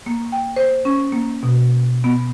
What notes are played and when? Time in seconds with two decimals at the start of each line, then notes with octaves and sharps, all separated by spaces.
0.06 A#3
0.32 G5
0.56 C5
0.85 C#4
1.12 A#3
1.43 B2
2.04 B3